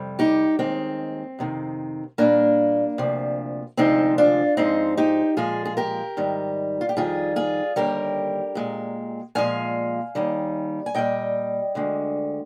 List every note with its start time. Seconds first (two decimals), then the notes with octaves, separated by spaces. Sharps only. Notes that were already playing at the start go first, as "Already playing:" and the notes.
Already playing: F2 C3 G3
0.19 D#4 G4
0.59 D#2 D#3 G#3 C4
1.39 F2 C3 D#3
2.18 A#2 G3 A#3 D4
2.98 D2 C3 F3
3.77 D2 C3 F3 G#3 C4 D#4
4.18 D4 F4
4.57 G#2 F3 G#3 C4 D#4
4.97 D#4 G4
5.37 A#2 F3 G#3 F4 G#4
5.65 G#4
5.77 G4 A#4
6.17 G#2 D#3 G3
6.81 F4
6.89 G4
6.96 F2 D#3 G3 F4 G#4
7.36 F4 G#4
7.76 D#2 D3 G3 G4 A#4
8.55 A#2 G#3
9.35 A#2 F3 G#3 F5 G#5
10.15 D#2 D#3 G3
10.86 G#5
10.94 A#2 G3 D#5 G5
11.75 D2 D3 G#3